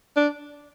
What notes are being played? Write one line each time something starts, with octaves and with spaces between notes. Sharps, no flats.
D4